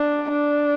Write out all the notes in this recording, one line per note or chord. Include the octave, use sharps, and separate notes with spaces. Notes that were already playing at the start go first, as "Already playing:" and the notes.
Already playing: D4
D4